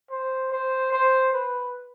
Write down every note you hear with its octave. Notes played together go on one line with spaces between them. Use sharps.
C5
C5
C5
B4